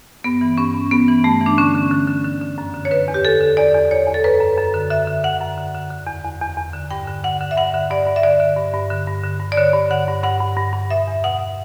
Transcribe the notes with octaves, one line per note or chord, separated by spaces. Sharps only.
G2 B3
E3
G2 C#4
G2
G2 B3
E3
G2 A3
E3
D4
D3 C#4
D3
D3
D3
D3
D3
F#2
D3
C#5
D3 B4
E2
G4
D3 A4
D3
E2 D5
E2
E2 C#5
E2
A4
F#2 B4
F#2
F#2
D3
D3 E5
D3
D3 F#5
F#2
D3
D3
D3
E2
E2
E2
E2
D3
G2 G5
D3
D3 F#5
D3
E5
G2 F#5
D3
G2 D5
G2
E5
D3 D5
D3
G2
G2
D3
G2
D3
G2
D5
D3 C#5
G2
D3 F#5
G2
G2 F#5
G2
G2
G2
B2 E5
E2
B2 F#5